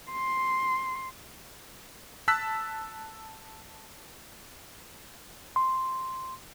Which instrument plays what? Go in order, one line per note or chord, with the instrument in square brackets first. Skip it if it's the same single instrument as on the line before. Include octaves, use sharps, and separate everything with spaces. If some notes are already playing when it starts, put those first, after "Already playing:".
[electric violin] C6
[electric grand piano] A5 E6 F#6 B6
[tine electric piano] C6